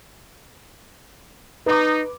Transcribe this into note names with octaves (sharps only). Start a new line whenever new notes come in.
D#4 B4 D6